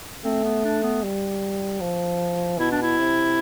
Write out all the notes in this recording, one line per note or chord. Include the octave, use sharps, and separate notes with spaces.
A3 C4
B3
D4
B3
G3
F3
B2 E4
D4
E4
C3